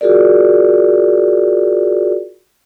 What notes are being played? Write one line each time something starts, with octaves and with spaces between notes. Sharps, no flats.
F4 F#4 G#4 A#4 D5